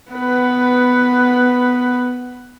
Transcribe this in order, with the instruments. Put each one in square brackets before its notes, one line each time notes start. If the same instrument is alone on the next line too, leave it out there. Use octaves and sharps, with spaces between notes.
[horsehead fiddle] B3 B4